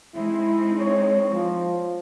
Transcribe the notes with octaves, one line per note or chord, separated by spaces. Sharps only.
G#3 C4 D#4 E4
C#5
F3